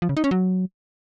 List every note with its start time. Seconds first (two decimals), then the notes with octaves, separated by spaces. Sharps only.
0.02 F3
0.09 C#3
0.17 D#4
0.24 C#4
0.31 F#3